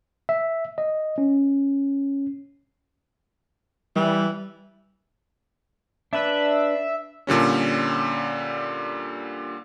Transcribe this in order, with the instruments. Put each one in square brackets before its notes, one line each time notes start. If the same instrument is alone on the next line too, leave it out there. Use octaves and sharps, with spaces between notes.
[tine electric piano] E5
D#5
C#4
[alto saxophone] E3 [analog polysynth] G3
[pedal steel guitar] D4 B4 [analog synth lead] E5
[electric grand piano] A#2 D3 G3 C#4